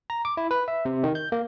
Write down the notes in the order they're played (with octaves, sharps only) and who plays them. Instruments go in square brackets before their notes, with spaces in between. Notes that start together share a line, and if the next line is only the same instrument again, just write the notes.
[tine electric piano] A#5
D6
E4
B4
E5
C3
D#3
G6
A#3